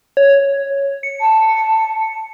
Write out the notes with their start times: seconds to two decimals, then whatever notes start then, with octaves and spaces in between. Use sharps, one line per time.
0.17 C#5
1.03 C#7
1.21 A5